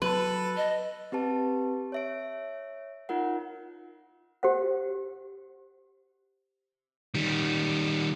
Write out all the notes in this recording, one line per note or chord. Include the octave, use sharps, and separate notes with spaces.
F#3 A4 B4
D#5
C4 G4 B4 A5
C#5 E5 D7
D#4 F4 A#4 F#5
G4 C5 F#5
D#3 G3